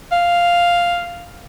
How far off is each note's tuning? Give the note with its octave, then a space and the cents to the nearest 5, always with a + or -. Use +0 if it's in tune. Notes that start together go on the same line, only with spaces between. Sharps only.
F5 +0